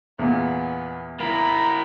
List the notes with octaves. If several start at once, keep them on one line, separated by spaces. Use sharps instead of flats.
E2 A#2 B3
A#3 E4 A#5 B5